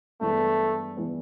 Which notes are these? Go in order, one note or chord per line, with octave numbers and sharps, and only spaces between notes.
G2 E3 G#3 A3 B3
E3 G#3 B3